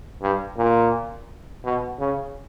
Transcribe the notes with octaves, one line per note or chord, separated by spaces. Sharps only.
G2
A#2
B2
C#3